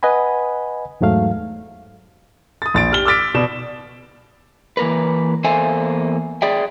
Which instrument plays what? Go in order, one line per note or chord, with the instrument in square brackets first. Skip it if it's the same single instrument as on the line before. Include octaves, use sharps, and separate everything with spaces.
[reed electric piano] B4 D#5 F#5 G#5 B5
E2 G#2 F#3 A3 F5
[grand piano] D#6 A6
A#1 A6 D7
G4 F6 G7
D6 E6 F6 A6 B6 D7
B2 D5 E7
[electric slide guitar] E3 A#3 A#4 B4
E2 A#3 A4 C5 E5 G#5
G#4 D5 E5 G5